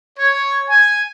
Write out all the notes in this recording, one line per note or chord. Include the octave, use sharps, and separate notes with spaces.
C#5
G#5